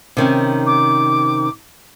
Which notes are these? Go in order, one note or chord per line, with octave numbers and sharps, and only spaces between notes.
C3 D#3 C#4
D6